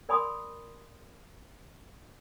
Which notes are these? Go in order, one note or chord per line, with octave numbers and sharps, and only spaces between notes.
A#4 D5 G#5 B5 C6 D#6